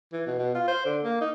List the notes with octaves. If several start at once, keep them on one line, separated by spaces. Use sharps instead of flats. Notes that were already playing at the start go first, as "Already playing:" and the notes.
E3
B2
B2
F4
C5
D3
A#3
D#4